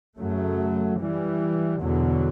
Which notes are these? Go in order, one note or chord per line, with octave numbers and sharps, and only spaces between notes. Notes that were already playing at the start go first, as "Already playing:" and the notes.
F#2 C#3 F#3 A3
E3 G3
E2 B2 D3 F#3